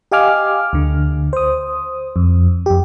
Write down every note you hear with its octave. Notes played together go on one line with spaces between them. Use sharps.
G4 D#5 F5 G#5 D6 F6
D2 D3
C5 D#6
F2
F2 G4